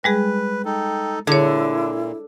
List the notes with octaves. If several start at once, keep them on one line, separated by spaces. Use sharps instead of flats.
G3 G#3 G#4 B4
D#4 A4 G5
A#2 D3 E4 G#4 C#5